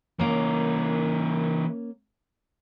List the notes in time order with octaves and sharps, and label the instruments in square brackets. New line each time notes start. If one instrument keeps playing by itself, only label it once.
[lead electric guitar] E3 A#4 [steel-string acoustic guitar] A#3 C#4